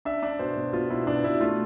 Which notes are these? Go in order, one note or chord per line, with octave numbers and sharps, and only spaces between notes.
D4 E5
D4
B2 C5
B2
B2 F4
B2 E4
B2 D4
B2 E4
A3 F4